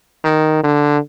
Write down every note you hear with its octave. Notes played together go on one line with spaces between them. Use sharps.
D#3
D3